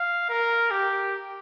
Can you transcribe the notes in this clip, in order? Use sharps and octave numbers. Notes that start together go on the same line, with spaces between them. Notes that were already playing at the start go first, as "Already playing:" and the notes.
Already playing: F5
A#4
G4